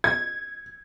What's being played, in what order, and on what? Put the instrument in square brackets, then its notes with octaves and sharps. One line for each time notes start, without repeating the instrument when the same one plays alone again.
[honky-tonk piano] G#6